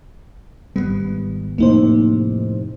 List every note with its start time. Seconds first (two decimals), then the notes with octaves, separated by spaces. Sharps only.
0.76 G#1 D#2 G3 B3
1.58 F2 A2 C3 A#3 D#4 C5